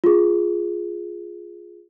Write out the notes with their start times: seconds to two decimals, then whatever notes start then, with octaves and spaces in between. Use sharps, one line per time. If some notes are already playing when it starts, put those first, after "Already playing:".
0.04 F4 G#4